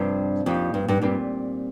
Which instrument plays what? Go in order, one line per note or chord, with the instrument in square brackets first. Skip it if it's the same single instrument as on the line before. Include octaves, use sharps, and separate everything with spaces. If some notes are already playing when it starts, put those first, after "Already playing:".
Already playing: [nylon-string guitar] G2 [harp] C3 F3 C4
[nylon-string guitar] F2 [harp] A#2 F3 D#4 G4
[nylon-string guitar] G2
G2
[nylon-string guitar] G2 [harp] A#2 G3 C4 F4